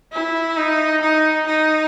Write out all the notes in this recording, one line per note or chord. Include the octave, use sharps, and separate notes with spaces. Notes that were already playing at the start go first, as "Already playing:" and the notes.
E4
D#4
D#4
D#4